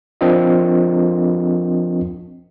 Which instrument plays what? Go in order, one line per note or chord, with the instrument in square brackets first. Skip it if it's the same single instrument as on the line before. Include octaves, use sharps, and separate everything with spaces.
[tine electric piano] F3 C4 D4 F4 A#4 D#5